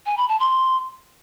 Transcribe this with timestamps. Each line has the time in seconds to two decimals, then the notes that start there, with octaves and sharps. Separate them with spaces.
0.06 G#5
0.17 B5
0.29 A5
0.40 C6